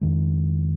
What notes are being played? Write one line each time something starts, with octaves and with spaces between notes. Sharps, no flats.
F2 D#3 G#3